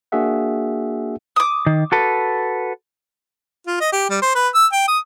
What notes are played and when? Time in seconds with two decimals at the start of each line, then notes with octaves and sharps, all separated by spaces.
0.12 A#3 D4 F#4 G#4 E5 F#5
1.36 D6 D#6
1.66 D#3
1.92 F#4 A4 B4
3.67 F4
3.81 D#5
3.92 G4
4.10 G3
4.22 C5
4.35 B4
4.55 E6
4.72 G5
4.88 D#6